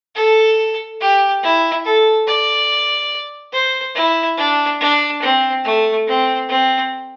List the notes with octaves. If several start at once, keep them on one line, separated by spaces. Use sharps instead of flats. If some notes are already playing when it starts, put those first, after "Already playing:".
A4
G4
E4
A4
D5
C5
E4
D4
D4
C4
A3
C4
C4